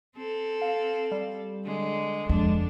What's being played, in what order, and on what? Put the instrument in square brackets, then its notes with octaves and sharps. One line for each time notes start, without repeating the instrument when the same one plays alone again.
[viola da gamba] C4 A4
[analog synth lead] F5
G3
[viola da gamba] D3 G#3
[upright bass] F2 [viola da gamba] D3 D4 [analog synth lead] G#3